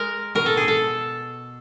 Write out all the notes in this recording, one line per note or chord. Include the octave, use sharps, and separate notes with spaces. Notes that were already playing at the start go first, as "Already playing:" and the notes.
Already playing: G#3 A#4
B2 A#4
A4
G#4
A4